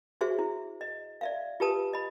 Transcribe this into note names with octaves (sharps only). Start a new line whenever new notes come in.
F#4 G#4 C5 E5 C#6
E4
D#5
D5 E5 F5
F4 G4 B4 A5 D#6
D#5 B5